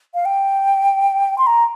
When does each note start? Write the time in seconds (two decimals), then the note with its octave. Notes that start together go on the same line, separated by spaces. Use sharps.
0.14 F5
0.25 G5
1.38 C6
1.47 A#5